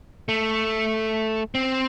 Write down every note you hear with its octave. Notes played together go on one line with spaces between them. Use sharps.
A3
C4